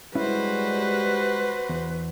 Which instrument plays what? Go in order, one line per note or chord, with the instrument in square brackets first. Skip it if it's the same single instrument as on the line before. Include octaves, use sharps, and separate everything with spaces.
[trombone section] G3 G#3 [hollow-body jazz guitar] C#4 E4 [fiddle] F#4 C5 [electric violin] B4
[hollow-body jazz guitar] E2